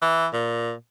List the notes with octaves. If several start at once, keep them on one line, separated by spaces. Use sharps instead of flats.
E3
A#2